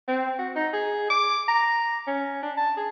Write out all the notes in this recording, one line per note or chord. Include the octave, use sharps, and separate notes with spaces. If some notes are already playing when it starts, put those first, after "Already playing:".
C4
F#4
D#4
G#4
D6
A#5
C#4
D4
A5
G#4